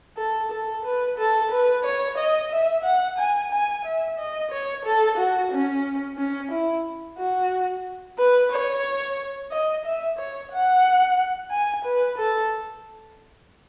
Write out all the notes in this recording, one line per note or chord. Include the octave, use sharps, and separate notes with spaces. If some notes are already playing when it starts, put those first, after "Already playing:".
A4
A4
B4
A4
B4
C#5
D#5
E5
F#5
G#5
G#5
E5
D#5
C#5
A4
F#4
C#4
C#4
E4
F#4
B4
C#5
D#5
E5
C#5
F#5
G#5
B4
A4